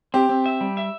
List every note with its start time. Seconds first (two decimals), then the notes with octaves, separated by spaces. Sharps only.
0.14 C4 G4
0.29 C4
0.46 E5
0.61 G3
0.77 E5